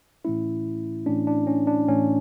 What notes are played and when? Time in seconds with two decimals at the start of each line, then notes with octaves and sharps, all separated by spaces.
0.24 A2 E3 A3 C#4 E4
1.06 A2 E3 A3 C#4 D4
1.27 D4
1.47 C#4
1.67 D4
1.88 A2 E3 A3 C#4